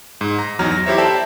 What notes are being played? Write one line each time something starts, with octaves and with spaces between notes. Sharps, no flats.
G#2
A#5
E2 F#3 D#4 A#5 F6
A#6
E4 G4 C5 C#5 E5
A4 C5 D5 E5 G5 A5